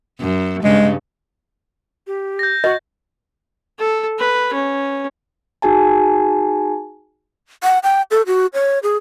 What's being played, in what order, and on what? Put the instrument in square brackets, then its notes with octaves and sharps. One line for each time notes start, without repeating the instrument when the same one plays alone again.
[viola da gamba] F#2
[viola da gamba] G2 C#3 [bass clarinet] G#3
[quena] G4
[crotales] G6 A#6
[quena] F#4 [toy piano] D#5
[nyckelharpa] A4
B4
C#4
[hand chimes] D#4 F#4 G#4 G#5 A5
[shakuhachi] F#5
G5
A4
F#4
C#5
G#4